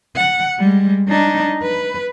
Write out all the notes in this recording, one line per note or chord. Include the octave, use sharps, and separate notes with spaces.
F#5
G3 G#3
D4 D#4
B4